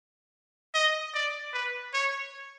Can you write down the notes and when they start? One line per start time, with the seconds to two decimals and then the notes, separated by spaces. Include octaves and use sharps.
0.75 D#5
1.14 D5
1.53 B4
1.94 C#5